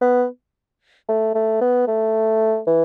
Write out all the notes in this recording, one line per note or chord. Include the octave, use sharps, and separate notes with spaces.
B3
A3
A3
B3
A3
E3